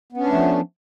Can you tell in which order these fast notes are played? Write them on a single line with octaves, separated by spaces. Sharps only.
B3 C#4 D4 A3 F3